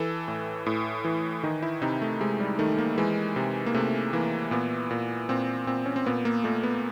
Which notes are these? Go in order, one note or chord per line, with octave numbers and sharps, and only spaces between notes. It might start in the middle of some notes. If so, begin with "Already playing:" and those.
Already playing: E3 A4
A2
A2
E3
D#3 D#4
E4
C3 D#4
A3
C3 G#3
G3
D#3 A3
A#3
E3 G#3
C3
A#3
C3 A3
E3 A#3
A#2 B3
A#2
A#2 C4
A#2 C4
C#4
C4
A#2 B3
A#3
A#2 A3
B3